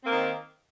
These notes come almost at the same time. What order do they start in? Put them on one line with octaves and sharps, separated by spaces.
C4 A#3 D#3